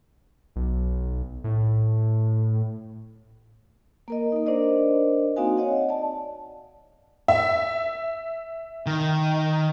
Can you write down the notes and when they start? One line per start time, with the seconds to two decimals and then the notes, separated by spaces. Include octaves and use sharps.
0.56 B1
1.44 A2
4.08 A#3 A#4 D#5
4.32 A#3 D#4
4.46 D4 A#4 C5 D5 D#5
5.36 A#3 C4 D#4 F#4 F5 G#5
5.57 C#5 D#5 F#5
5.89 D5 A5
7.28 E5
8.87 D#3